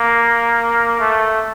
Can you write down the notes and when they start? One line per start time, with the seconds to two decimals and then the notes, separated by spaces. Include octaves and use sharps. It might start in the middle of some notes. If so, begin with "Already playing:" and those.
Already playing: A#3
1.00 A3